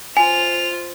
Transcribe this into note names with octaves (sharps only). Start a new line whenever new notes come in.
F4 C5 G#5 F7